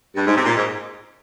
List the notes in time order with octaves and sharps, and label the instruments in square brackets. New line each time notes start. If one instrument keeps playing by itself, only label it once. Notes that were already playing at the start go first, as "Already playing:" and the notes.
[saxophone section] G2
G#2
C3
A#2
G#2